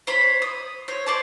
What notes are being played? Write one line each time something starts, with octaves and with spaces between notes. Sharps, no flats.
C5 C#5 B5
D#6
C5 C#5
C5 D5 A5